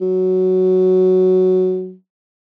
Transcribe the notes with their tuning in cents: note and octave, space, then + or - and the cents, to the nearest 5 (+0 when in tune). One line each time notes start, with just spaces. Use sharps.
F#3 +5